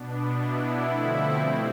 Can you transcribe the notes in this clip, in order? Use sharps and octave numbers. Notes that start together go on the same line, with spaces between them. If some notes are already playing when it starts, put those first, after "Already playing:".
Already playing: B2 B3 D4
B2 B3 D4 E4
D3 F3 A3 C4
B2 G3 C4